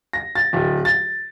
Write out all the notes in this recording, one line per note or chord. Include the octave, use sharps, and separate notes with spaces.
A#6
A6
D1
A6